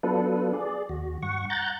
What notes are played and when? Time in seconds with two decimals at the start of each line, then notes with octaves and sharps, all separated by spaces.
0.03 F#3 B3 D4 F4 A4 B4
0.53 G#4 D5
0.89 D#2 F#4
1.22 G2 F#5 C#6
1.50 F#5 A#5 F#6 G6 A6